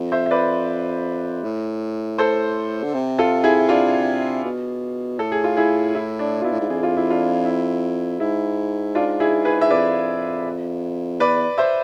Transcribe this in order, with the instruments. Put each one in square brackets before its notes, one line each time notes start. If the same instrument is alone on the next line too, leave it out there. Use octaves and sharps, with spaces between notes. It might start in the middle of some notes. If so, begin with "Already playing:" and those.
Already playing: [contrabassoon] F2
[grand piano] C5 E5
E5
B4 D5
[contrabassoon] A2
[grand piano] A4 C5
[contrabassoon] D3
C3
[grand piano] F4 A4
E4 G#4
D4 F4
[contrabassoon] B2
[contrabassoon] A2 [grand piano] A4
[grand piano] G#4
F4
E4 G#4
E4
D4
F4
[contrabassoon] B2 [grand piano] E4
[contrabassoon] A2
G#2
[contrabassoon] F2 [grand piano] G#4
[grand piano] F4
E4
D4 F4
E4
[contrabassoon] G#2 [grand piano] E4
[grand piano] D4 F4
E4 G#4
G#4 B4
E5
[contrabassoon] F2 [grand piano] B4 D5
[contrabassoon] E2 [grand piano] B4 D5
[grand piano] C5 E5